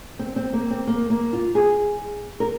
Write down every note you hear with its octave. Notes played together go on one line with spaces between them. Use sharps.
C4
C4
A#3
C4
A#3
A#3
F4
G#4
A#4